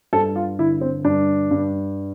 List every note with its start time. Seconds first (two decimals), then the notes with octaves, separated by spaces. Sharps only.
0.13 G2 A4
0.36 F4
0.58 D3 E4
0.81 C4
1.04 G2 D4
1.51 G2